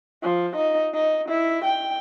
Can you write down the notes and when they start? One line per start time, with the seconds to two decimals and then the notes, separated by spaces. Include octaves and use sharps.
0.23 F3
0.56 D#4
0.94 D#4
1.29 E4
1.65 G5